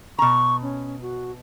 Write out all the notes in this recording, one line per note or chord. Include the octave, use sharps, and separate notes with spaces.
B2 A#5 C#6
C#4
F#4